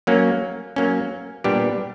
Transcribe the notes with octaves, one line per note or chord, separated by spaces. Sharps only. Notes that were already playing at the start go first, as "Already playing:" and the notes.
F#3 A#3 C#4
F#3 A#3 C#4
A#2 G3 B3 D4 G4